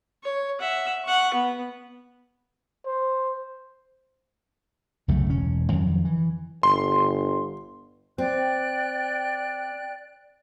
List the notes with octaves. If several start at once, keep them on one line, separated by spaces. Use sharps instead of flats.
C#5
E5 F#5
F#5 C#6
B3
C5
C2 F#2 C#3 A3
E1 C#4
F2 D#3 F#3
E3
G1 C6
C4 D5 G5 F#6